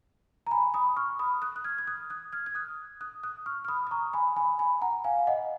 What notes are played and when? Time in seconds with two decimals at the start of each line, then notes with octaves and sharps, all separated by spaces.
0.47 A#5
0.51 G#5 B5
0.74 B5 D#6
0.97 C#6 F6
1.19 B5 D#6
1.42 D#6 F#6
1.56 F#6
1.65 F6 G#6
1.78 G#6
1.87 D#6 F#6
2.10 D#6 F#6
2.33 F6 G#6
2.46 G#6
2.55 D#6 F#6
3.01 D#6 F#6
3.23 D#6 F#6
3.46 C#6 F6
3.65 F6
3.68 B5 D#6
3.87 D#6
3.91 A#5 C#6
4.13 G#5 B5
4.36 G#5 B5
4.59 G#5 B5
4.81 F#5 A#5
5.04 F5 G#5
5.19 F5
5.27 D#5 F#5